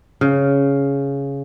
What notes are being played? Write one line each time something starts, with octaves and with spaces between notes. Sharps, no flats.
C#3